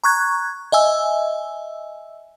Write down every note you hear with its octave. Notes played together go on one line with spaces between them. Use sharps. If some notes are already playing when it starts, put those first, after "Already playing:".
A#5 C#6 F#6 G#6
D#5 E5 G#5 E6